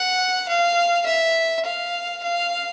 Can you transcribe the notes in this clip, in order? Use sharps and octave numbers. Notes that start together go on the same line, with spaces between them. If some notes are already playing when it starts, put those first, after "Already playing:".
Already playing: F#5
F5
E5
F5
F5